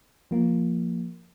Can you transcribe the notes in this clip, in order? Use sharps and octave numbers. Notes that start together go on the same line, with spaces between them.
F3 A#3